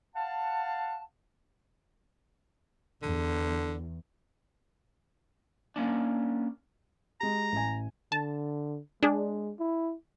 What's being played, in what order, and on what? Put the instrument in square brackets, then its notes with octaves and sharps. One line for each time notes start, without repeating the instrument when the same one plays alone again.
[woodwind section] F5 F#5 A5
[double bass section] E2 [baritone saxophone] D3
[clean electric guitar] A#3 C#4 D4
[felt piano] G#3 G4 [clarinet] A#5
[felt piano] A1 G#5
[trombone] D3 [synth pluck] A5
[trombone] G#3 [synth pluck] D4 G#4
[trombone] E4